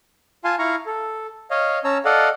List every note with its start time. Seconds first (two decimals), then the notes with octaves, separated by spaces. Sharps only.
0.45 F4 F5 G#5 A5 C6
0.59 E4 F5 A#5 C#6
0.86 A4
1.51 C#5 D#5 F5
1.84 C#4 C#5 A5 A#5 E6
2.05 A4 D5 D#5 F5 F#5